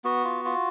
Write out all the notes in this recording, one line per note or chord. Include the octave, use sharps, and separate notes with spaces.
B3 F#4
F4
F4